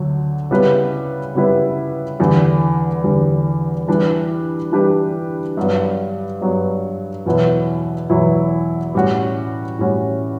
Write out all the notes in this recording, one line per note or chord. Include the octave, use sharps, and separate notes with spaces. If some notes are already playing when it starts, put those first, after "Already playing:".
Already playing: D2 D3 F#3
C#3 G3 B3 E4 B4
C#3 G3 B3 E4 B4
E2 D3 G3
E2 D3 G3
E3 G3 D4 G4 B4
E3 G3 D4 G4 B4
G2 F#3 B3
G2 F#3 B3
E2 B2 F#3 B3 E4
E2 B2 F#3 B3 E4
A2 G3 C#4 F#4
A2 G3 C#4 F#4